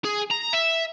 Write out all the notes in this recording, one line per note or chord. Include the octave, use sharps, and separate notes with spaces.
G#4
A#5
E5